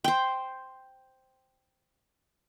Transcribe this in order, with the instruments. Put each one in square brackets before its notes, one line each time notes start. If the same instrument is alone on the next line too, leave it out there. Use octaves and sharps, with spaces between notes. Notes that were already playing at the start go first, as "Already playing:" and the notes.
[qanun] C5 G5